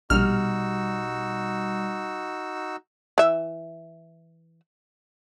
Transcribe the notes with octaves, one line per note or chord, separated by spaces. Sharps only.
A#1 B2 G3 D#4 F#4 E6 F6
E3 E5